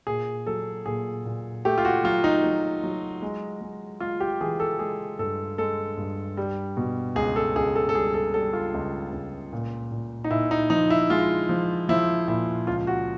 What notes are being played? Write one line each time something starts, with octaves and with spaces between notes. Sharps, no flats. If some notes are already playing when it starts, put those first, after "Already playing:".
A#2 G#4
F#3 A4
A#2 G#4
A#2
A3 G4
F4
F#4
F#3 F4
D#4
F#3
F#3
G#3
G#3
G#3 F4
G4
E3 G#4
A4
G#3 G#4
G2 A4
G#3 A4
G2
G3
B2
C#2 G#4
A4
C#2 G#4
A4
A4
G3 G#4
A4
G3 A4
F4
C#2
C#2
A#2
A#2
D#4
A#2 E4
D#4
F3 D#4
E4
G#3 F4
F3
F3 E4
A#2 E4
C#2 F4
F#4